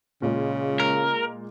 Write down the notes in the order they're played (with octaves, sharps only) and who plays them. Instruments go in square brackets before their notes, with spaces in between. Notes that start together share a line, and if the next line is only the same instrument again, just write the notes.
[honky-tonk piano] A#2 G#3 [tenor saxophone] C#3
[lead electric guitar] A#4